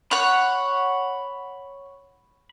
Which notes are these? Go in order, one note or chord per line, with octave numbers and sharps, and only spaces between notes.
C#5 F#5 B5